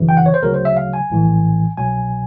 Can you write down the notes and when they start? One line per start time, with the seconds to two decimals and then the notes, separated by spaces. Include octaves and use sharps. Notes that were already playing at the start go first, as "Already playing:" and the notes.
Already playing: G1 F#2 C#3 E3
0.09 G5
0.17 F#5
0.26 C#5
0.34 C5
0.42 D2 C#3 F#3 A#4
0.54 C5
0.65 E5
0.77 F5
0.94 G#5
1.10 A#1 A2 E3
1.78 C2 B2 F#3 G#5